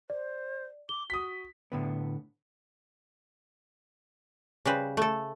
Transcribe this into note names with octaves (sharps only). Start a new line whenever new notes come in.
C5 D5
D6 G7
F#4 D#6 B6
A2 D3 B3
C#3 G3 B4 C5
A3 A4